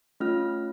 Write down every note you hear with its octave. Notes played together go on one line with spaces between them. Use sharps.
A3 C#4 F4 F6